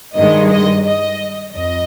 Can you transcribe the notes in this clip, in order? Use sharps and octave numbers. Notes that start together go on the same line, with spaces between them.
G2 D#3 G#3 D#5
D#5
D#5
F2 D#5